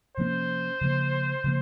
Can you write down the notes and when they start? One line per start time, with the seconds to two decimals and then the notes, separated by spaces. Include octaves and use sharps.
0.17 C3 F3 A#3 C#4 C5
0.81 C#3 F3 A#3
1.44 C#3 F3 A#3